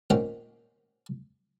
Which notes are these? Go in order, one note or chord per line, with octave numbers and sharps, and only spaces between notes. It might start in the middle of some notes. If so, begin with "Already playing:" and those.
A#2 D#3 C4 C#4 F#5